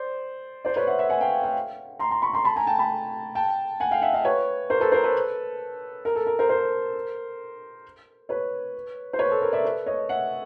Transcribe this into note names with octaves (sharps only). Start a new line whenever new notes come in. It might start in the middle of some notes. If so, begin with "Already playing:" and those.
Already playing: C5 D5
C5 D5
B4 C#5
E5 F#5
E5 F#5
F#5 G#5
F5 G5
F5 G5
A#5 C6
A#5 C6
B5 C#6
A#5 C6
A5 B5
G#5 A#5
G5 A5
A5 B5
G5 A5
F#5 G#5
F5 G5
E5 F#5
D#5 F5
B4 C#5
A#4 C5
A4 B4
A#4 C5
A4 B4
A#4
A4
A#4
A#4 C5
A#4 C5
B4 C#5
C5
B4 C#5
A4
A#4
D5 E5
A4 B4
C#5 D#5
E5 F#5